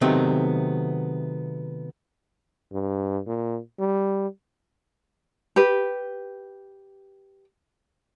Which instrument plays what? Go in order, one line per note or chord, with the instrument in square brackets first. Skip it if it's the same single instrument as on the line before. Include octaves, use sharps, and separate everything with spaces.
[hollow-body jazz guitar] C3 D#3 F#3 A3 B3 C4
[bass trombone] G2
A#2
G3
[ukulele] G4 B4